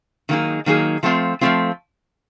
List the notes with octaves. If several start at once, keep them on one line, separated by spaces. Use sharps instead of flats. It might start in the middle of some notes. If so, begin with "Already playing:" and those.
D#3 F#3 A#3 D#4 G#4
D#3 F#3 A#3 D#4 G#4
F3 A3 C4 F4
F3 A3 C4 F4